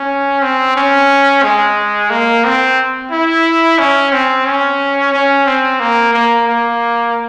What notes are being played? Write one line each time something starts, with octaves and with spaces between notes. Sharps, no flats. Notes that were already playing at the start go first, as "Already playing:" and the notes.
Already playing: C#4
C4
C#4
G#3
A#3
C4
E4
C#4
C4
C#4
C#4
C4
A#3
A#3
A#3